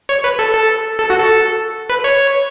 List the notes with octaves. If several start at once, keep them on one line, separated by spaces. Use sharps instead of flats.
C#5
B4
A4
A4
A4
F#4
A4
B4
C#5